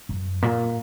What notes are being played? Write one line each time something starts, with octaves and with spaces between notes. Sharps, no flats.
F#2
A#2